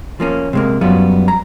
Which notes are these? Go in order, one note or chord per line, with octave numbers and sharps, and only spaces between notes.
F3 A#3 C#4
C3 G#3 A#3
F#2 F#3 G3 B3 F4
A#5